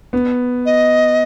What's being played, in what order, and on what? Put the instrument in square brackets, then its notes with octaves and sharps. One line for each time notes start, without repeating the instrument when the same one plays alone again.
[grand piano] B3
[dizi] D#5